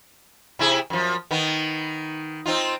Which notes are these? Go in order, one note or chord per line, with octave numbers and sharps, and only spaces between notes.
C3 E4 G#4
F#2 F3
D#3 B3
C4 D#4 F4